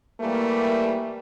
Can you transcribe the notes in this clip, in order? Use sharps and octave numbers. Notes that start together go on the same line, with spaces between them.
E3 G3 A3 A#3